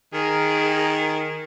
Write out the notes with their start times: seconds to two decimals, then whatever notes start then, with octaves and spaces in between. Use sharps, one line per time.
0.14 D#3 G#4 A#4